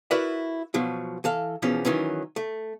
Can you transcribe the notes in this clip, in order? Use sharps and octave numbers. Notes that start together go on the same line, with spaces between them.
E4 F#4 A#4 B4 D5 E5
B2 F3 F#3
E3 A4 F5
E2 B2 E3 F3 C#4
D#3 E3 F#3 C#4
A3